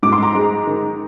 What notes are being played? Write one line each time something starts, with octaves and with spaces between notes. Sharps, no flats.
G#2 D6
C6
A#5 D6
G#3
D#3